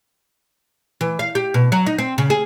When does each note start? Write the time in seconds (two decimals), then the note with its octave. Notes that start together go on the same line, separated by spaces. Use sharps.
1.01 E3
1.19 F5
1.35 G4
1.54 B2
1.72 F#3
1.87 D#4
1.98 C4
2.18 C#3
2.30 G#4